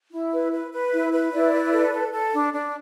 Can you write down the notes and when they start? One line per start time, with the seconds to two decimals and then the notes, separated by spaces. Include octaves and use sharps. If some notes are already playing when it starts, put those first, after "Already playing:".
0.12 E4
0.32 B4
0.52 B4
0.72 B4
0.92 E4 E5
1.12 B4
1.33 E4 D5
1.52 B4
1.73 A4
1.93 A4
2.12 A4
2.33 D4
2.53 D4